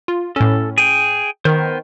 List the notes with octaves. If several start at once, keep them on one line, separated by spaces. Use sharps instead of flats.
F4
A2 C#4 A4
G#4 G5
D#3 B3 A#4 C5